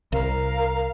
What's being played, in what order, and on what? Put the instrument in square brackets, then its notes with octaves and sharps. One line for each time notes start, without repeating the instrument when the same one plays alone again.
[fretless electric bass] C2 [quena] A#4 [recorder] F5